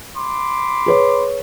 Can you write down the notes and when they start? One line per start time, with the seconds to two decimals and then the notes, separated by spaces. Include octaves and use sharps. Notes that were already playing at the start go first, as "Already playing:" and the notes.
0.16 B5 C6 D6
0.86 G#4 B4 C#5